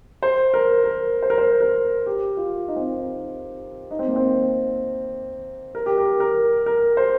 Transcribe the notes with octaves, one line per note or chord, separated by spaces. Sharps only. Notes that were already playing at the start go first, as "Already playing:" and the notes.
C5
A#4
A#4
C5
A#4
C5
A#4
G4
F4
D#4
C4
D#4
D#4
C4
A#3
C4
A#4
G4
A#4
A#4
A#4
C5